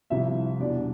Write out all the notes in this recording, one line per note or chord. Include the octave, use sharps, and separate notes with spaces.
C2 C3 F3 E4 E5
E2 B2 G3 D4 D5